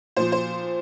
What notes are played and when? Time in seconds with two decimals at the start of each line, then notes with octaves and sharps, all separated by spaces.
0.17 A#2 F3 C5
0.32 C5